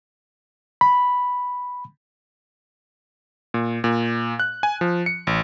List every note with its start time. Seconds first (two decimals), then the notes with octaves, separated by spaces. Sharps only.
0.81 B5
3.54 A#2
3.84 A#2
4.40 F#6
4.63 G#5
4.81 F3
5.06 C#7
5.27 A1